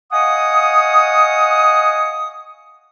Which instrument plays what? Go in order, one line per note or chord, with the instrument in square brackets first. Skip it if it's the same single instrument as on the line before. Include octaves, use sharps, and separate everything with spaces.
[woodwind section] D#5 F5 F#5 G#5 C#6 D#6